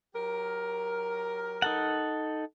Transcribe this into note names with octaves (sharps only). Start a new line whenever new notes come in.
F#3 G4 A#4
D#4 A4 F#5